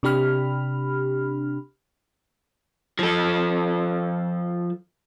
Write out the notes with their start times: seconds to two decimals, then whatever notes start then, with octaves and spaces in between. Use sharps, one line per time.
0.03 C3 D4 G4 B5 F6
2.99 F3 A4